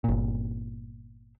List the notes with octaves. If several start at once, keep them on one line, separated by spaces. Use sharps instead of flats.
G1 A#2